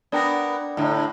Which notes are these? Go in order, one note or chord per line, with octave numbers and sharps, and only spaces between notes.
B3 D4 A#4 D5 G5 A#6
A2 D3